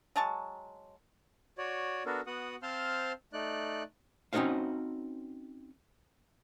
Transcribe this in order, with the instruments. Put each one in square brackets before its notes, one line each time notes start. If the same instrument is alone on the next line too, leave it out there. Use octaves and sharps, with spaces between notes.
[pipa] F#3 G#3 A5 C#6
[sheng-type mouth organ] F#4 C#5 D5
B3 D4 F#4 A4 A#4
B3 F#4 F#5 D#6
C4 C5 F5 A5 C6 F6
A3 D#4 D5 F#6
[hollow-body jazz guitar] C4 C#4 D#4 F#4 C5 F5